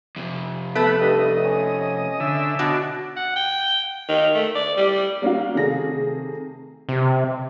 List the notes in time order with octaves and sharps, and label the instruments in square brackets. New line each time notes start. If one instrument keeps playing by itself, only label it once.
[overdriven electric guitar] F2 C3
[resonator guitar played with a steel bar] A3 [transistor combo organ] B3 B4
[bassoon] G2 [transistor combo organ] D#5
[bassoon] C#4
[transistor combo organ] D3 E5
[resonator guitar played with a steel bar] B2 [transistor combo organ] D4 F#4
[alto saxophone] F#5
G5
D#3
A3
D5
G3
[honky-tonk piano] G3 A#3 C#4 D#4 F#4 F5
C3 D#3 A3 G#4 A#6
[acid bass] C3